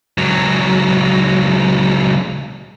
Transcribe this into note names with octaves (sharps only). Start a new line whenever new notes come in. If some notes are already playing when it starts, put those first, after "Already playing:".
C#2 F#3